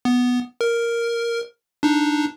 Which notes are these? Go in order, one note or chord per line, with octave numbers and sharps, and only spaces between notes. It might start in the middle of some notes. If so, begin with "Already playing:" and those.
B3
A#4
D4 D#4